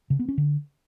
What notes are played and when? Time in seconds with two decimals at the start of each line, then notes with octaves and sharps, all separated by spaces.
0.10 C#3
0.19 B3
0.29 C#4
0.38 D3